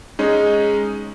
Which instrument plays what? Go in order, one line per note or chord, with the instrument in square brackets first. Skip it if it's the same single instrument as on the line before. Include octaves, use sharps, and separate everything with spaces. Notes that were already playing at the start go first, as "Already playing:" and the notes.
[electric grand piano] G#3 C#4 D#4